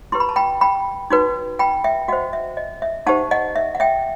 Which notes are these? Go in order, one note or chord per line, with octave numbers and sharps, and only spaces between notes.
E4 G4 B4 C6
B5
A5
G5 B5
G5 B5
D#4 F#4 B4
G5 B5
E5 G5
F#4 C5 D#5 F#5
E5
D#5
E5
D#4 G4 C5 F#5 A5
D#5 F#5
E5
F#5
E5 G5